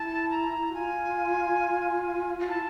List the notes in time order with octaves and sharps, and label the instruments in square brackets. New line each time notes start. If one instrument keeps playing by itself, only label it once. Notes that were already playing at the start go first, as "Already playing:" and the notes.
Already playing: [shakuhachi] E4 [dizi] A5
[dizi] A#5
[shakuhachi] F#4
[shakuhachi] F4 [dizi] G#5
[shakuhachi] F4
[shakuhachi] E4 [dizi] A5